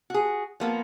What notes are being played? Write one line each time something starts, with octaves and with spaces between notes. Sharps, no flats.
F#4 G#4
F3 A#3 B3